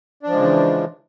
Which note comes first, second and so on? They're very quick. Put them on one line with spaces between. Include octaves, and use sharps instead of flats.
D4 F3 G#3 C#3 E3